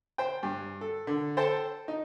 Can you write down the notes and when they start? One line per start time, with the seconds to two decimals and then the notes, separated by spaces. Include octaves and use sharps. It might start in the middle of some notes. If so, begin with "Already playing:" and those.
0.18 C5 G5
0.43 G2
0.81 A4
1.07 D3
1.37 A4 C5 G5 A5
1.88 D#4